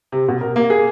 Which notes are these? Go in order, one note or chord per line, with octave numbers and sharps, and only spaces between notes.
C3
B2
A#4
A#3
G#4